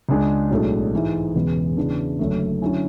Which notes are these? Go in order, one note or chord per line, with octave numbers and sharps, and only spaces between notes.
C#2 C#3 G#3 D4 G#4
B1 A2 G#3 D4 A4
G#2 E3 G#3
E1 E2 C#3 G#3 B3
E2 C#3 E3 B3 D4
F#1 F#2 D3 A3
D3 F#3 C#4 E4